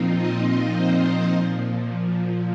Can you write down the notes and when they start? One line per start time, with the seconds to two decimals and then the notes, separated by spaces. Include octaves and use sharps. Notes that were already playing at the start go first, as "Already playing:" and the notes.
Already playing: A#2 F3 C4 D#4 F4
0.15 D#5
0.73 C5
1.30 A#2 F3